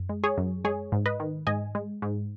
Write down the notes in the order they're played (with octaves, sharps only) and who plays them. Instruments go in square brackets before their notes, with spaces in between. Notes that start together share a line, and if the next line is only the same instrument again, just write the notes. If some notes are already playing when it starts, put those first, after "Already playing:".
Already playing: [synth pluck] F#2
G#3
G#4 C#5
F#2
G#3 G#4 C#5
G#2
B4 D#5
D#3
G#2 D#5 G#5
G#3
G#2